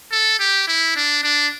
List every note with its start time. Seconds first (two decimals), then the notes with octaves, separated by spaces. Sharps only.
0.12 A4
0.40 G4
0.68 E4
0.96 D4
1.23 D4